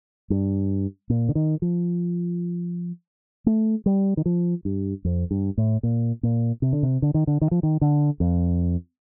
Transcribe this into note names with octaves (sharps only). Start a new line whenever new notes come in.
G2
A#2
D3
D#3
F3
A3
G3
D#3
F3
G2
F2
G2
A2
A#2
A#2
C3
D3
C3
D3
D#3
D3
D#3
F3
D#3
D3
F2